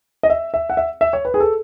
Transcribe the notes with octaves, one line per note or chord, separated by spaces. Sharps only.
D#5
E5
E5
F#5
E5
E5
C#5
B4
G#4
A4